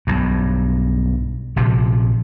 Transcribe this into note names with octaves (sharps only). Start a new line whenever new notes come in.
B1 G2
A#1 C3 F3